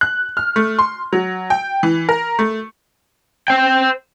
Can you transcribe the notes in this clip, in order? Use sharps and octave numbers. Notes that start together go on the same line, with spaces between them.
F#6
F6
A3
C6
F#3
G5
E3
A#4
A3
C5 G5